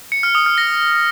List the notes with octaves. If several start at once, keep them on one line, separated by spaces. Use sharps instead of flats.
C#7
F6
D#6
F6
A#6